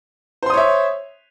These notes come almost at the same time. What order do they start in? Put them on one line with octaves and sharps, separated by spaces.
C5 C6 D#6 C#5 E5